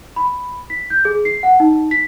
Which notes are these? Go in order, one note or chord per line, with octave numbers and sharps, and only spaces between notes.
B5
B6
G6
G#4
C7
F#5
D#4
B6